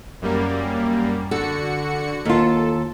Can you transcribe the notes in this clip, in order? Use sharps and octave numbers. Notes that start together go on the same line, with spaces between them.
F#2 G3 A#3
D3 F#4 A4 C#7
D#2 F4 A4